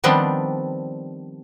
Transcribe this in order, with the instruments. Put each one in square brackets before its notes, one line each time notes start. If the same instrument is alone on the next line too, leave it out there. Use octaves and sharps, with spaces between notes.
[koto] D#3 F3 G3 B3 C4 D4